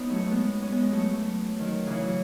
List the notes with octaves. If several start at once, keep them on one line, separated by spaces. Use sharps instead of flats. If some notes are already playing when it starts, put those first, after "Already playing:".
Already playing: B3 C#4 D#4
F#3 A3
A3
G#3 B3
C#4
G#3 B3
F#3 A3
F#3 A3
D#3 F#3
C#3 E3
F#3